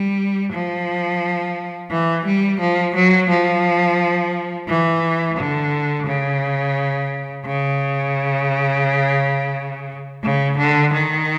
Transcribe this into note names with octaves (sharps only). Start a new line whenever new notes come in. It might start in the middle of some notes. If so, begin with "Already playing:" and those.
Already playing: G3
F3
E3
G3
F3
F#3
F3
E3
D3
C#3
C#3
C#3
D3
D#3